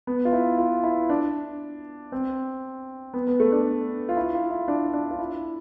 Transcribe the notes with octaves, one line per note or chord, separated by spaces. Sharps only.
B3
F4
E4
F4
E4
D4
C4
B3
B3
A3
D4
F4
E4
F4
E4
D4
D4
F4
E4